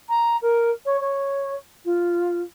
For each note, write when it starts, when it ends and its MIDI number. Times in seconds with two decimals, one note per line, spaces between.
0.09 0.37 82
0.42 0.71 70
0.86 1.00 73
1.01 1.55 73
1.85 2.41 65